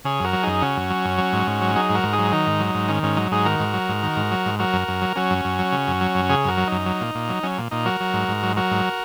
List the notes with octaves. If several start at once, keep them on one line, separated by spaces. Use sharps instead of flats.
C#3 G#4 C#5
F#2 F#4 A#4
F#3
F#2 D#4 G#4
C#3 C#4 F#4
F#2
F#3
F#2
F#3
G#2
G#2
F#3
F#3 D#4 G#4
G#2
F#4 A#4
G#2
D#4 G#4
F#3
D#3 D#4
G#2
F#3
G#2
D#3 C#4
G#2 C#4
F#3 D#4
G#2 D#4 G#4
D#3 F#4 A#4
G#2
F#3
G#2
D#3
G#2
F#3
G#2
F#3 F#4 A#4
F#2
F#2
F#3
F#3 C#4 F#4
F#2
F#2
F#3
C#3
F#2
F#3
F#2
C#3 G#4 C#5
F#2 F#4 A#4
F#3
F#2 D#4
F#3
A#2
A#2
F#3
F#3 C#4
A#2
A#2 D#4
F#3 F#4 A#4
F#3
G#2
G#2
F#3
F#3 F#4 A#4
G#2